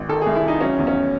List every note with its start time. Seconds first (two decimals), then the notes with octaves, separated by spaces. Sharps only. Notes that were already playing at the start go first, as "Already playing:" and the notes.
Already playing: G#1
0.09 D#3 A4
0.22 G#4
0.26 C2
0.35 E4
0.43 C2 D#4
0.61 F#3 C#4
0.79 E2
0.87 C#4